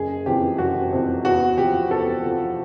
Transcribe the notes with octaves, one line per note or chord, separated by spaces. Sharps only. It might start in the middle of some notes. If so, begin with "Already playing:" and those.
Already playing: F#1 G#4
F2 C3 E3 G4
F#1 F#4
F2 C3 E3
E2 F#4
C3 F3 G4
E2 A4
C3 F3